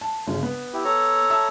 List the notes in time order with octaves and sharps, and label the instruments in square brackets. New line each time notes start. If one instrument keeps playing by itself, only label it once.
[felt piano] A5
G1 C#3
B3
[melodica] E4 G4
A4 C#5 A#5
[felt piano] E5 A5 E6